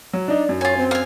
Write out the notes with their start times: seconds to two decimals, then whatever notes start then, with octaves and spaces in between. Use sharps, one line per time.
0.13 F#3
0.28 D4 D#4 D5
0.49 F#2
0.61 F4 C#5 G#5
0.78 C4
0.91 F5 G#5